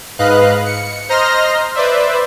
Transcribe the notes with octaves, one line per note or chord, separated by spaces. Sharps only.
G#2 B4 D#5 F5 F#6
C#7
C5 D#5 A#5 C6 F6 A#6
B4 C5 D5 E5